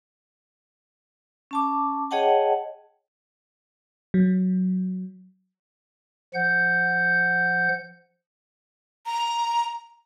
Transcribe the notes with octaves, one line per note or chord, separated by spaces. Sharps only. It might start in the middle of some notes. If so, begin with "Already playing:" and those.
C#4 A5 D6
G#4 C#5 D#5 F#5 G5 A5
F#3
F3 F#5 G6
A#5